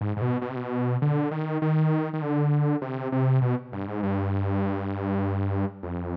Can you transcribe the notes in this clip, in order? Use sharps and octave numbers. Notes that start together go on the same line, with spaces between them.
G#2
G#2
B2
B2
C3
B2
D3
D#3
D#3
D#3
D3
C3
C3
B2
G2
G#2
G2
F2